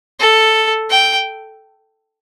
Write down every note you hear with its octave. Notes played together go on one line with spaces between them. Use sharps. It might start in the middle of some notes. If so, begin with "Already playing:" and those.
A4
G5